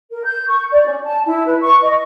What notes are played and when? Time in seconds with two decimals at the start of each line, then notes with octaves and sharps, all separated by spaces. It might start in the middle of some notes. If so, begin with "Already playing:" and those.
0.11 A#4
0.25 G6
0.48 C#6
0.71 D5
0.86 C#4
1.04 A5
1.26 E4
1.46 B4
1.61 C#6
1.82 D#5